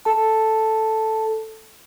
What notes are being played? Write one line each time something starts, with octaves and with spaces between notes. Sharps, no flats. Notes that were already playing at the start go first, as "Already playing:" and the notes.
A4 A5